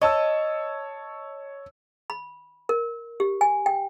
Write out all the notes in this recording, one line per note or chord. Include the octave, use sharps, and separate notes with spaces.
C#5 D#5 A5 E6
B5
A#4
G4
G#5
G5